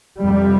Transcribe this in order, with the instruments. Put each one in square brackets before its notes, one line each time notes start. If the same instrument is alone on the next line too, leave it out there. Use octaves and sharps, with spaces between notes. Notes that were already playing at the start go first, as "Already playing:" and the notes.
[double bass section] F2 C3 G3